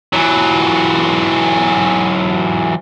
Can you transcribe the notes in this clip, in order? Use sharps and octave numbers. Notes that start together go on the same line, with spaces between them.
E3 F#3